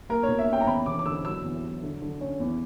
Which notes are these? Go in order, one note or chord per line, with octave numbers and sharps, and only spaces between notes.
A#3 A#4
C#5
B2
E5
C#4 G5
A#5
E2 B5
E1 D6
D6
D3 E6
F#3 E6
E2
F#3
D3
D3
C#4
E2